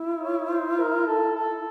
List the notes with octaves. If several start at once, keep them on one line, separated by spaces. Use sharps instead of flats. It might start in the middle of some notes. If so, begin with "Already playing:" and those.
Already playing: E4
C#5
C5
A#4
A4
A4